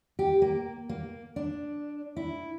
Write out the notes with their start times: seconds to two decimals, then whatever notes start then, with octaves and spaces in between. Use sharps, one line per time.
0.19 G4
0.42 A#3
0.89 A#3
1.36 D4
2.16 E4